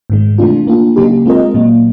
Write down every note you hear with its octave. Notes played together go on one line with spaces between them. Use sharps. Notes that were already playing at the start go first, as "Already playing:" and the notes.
G#2 D#3 G#3
C3 E3 A3 D4 F4
A#3 D4 F4
C#3 F#3 A#3 D#4 G4
G#3 C4 F4 A#4 D#5
A#2 F#3 A#3